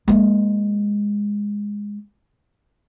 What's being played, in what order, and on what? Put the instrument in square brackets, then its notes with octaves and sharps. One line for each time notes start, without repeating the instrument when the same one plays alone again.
[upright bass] G#3 A#3